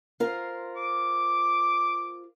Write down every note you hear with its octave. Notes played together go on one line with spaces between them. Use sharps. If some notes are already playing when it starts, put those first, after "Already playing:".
F4 A#4 C5
D6